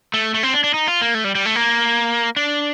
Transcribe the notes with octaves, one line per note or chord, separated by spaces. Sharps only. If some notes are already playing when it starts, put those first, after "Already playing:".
A3
A3
C4
D4
D4
D#4
F4
A#3
A3
G3
G3
A3
A#3
D4